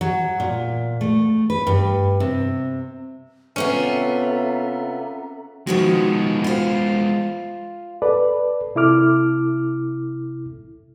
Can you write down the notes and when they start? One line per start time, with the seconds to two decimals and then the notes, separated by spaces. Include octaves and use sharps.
0.01 F#3
0.40 A#2
1.01 A3
1.50 B4
1.67 G2
2.20 C3
3.56 C3 B3 C#4 F4 A4 E5 A#5
5.67 D#3 F3 G#3 B3 F#4
6.44 F4 C5
8.02 A4 B4 D5
8.75 C3 E4 A4 D6 F6